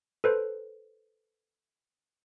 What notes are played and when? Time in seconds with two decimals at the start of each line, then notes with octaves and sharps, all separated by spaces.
0.24 A4 B4 C5